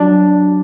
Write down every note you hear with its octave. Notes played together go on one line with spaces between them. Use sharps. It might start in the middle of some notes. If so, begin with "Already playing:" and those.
Already playing: F#3 D4 D5